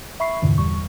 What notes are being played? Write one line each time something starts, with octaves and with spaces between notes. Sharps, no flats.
E5 B5 C#6 C7
E2 G2 A#2 D3 E3
E2 G3 C#6